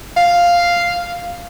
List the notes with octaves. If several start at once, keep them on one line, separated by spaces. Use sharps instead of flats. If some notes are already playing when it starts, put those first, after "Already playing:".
F5